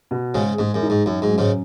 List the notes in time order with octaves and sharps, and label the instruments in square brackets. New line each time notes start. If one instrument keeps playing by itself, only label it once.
[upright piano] B2
[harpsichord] G#2 C#3 [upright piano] G#4
[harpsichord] G#2 [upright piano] G#3
[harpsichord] F#2
[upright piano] D#4
[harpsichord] G#2
[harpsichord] F#2 [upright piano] F#3
[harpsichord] G#2
[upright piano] F#2
[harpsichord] G#2 C#3